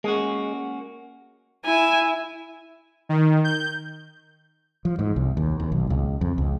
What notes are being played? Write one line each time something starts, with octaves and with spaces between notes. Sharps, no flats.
G#3 A#3 C#4 F#4
E4 G#5
D#3
G6
F3
G#2
C2
D#2
D#2
B1
C#2
F2
C#2